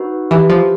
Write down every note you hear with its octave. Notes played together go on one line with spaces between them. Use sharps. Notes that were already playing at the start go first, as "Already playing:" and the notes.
Already playing: D#4 F#4 B4
E3 E4 G4 B4 E5
F3